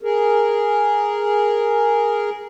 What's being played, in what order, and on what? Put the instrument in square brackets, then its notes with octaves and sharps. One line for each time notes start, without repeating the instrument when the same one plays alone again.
[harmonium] G#4 A#4